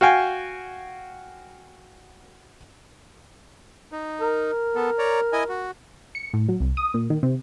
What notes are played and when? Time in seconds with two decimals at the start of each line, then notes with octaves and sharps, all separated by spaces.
0.01 F#4 F5 G5 G#5
3.92 D#4
4.21 A#4
4.75 B3 A4
4.99 C#5 D5 A#5
5.33 E4 D#5 G#5
5.49 F#4
6.15 C#7
6.33 A2
6.49 F#3
6.60 C2
6.77 D#6
6.94 A#2
7.10 D#3
7.23 C3